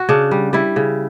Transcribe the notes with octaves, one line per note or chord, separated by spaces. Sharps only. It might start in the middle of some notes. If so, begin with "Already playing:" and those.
Already playing: F#4
C#3 D4
G3
G3 E4
C#3